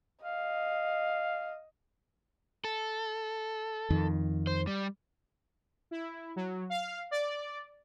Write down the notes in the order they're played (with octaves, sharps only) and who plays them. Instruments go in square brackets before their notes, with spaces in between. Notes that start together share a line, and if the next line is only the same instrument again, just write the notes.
[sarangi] D#5 [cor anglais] F5
[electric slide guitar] A4
[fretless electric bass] F2 D#3
[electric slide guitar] C5
G3
[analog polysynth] E4
F#3
F5
D5